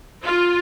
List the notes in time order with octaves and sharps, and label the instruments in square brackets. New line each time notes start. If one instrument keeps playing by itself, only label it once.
[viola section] F4